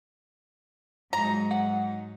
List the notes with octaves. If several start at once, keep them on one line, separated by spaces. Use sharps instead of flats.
G#2 F#3 D#4 A#5
F#5